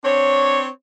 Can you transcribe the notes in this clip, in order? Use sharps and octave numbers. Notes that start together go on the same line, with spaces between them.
C4 D4 C#5